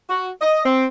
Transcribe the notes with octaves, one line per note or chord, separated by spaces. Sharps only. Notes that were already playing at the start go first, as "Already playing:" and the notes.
F#4
D#5
C4